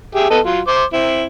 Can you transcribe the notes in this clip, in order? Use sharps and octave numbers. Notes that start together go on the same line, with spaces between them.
G4 G#4 E5
B3 A4 D#5
F#3 F4
C5 D6
C4 E4